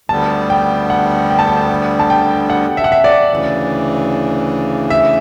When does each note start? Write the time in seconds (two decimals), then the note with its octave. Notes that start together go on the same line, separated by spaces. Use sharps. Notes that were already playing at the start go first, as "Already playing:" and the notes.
0.09 D2 D3 G3 B3 A5
0.50 G5
0.90 F#5
1.30 G5
1.39 A5
1.48 G5
1.99 A5
2.10 G5
2.50 F#5
2.77 E5
2.84 F#5
2.92 E5
3.04 D5
3.30 D2 C#3 E3
4.90 E5